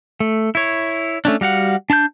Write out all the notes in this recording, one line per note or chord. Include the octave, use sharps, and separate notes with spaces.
A3
E4 C#5
A3 C#4 D4
G3 F#4 F5 F#5
D4 A5 B5 G6